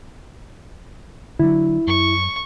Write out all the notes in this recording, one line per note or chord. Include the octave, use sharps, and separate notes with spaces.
D3 F3 F#3 E4
F#2 C#6